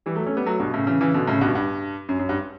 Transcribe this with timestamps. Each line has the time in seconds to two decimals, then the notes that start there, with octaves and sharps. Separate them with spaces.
0.06 E3 G3
0.16 F#3 A3
0.26 A3 C#4
0.37 G3 B3
0.46 F#3 A3
0.59 G2 B2
0.74 A2 C#3
0.87 C#3 E3
1.01 C#3 E3
1.14 B2 D3
1.27 A2 C#3
1.41 G2 B2
1.55 G2
2.09 F#2
2.19 F#2
2.29 G2